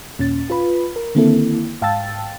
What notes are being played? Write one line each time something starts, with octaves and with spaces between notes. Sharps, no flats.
D#2 A#2 C#4 A6
F4 B4 B5
A#4
D3 D#3 A#3 C4 E4 A4
G#2 F5 G5 A5 E6 A6